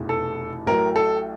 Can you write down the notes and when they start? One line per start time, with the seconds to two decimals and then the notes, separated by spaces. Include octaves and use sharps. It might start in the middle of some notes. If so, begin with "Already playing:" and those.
Already playing: F1 E2 B2
0.09 A4
0.67 A1 A2 F#3 A#4
0.96 A4